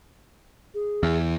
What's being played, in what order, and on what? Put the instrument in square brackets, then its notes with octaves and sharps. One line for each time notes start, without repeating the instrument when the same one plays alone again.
[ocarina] G#4
[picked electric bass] E2